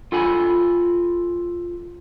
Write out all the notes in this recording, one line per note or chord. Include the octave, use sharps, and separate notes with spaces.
F4 A4 G#5 B5